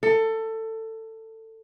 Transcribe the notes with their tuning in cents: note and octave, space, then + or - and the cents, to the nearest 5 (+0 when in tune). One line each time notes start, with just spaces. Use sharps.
A4 +20